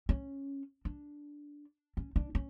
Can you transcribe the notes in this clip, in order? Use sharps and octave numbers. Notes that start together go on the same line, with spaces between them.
C#4
D4
C#4
D4
C#4